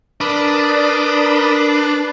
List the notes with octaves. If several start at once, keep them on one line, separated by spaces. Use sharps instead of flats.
D4 A#4 B4 D5 B5 D#6